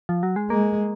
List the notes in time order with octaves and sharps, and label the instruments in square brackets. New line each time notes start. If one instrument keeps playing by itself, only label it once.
[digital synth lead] F3
F#3
G#3
[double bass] G#3 [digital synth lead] A#3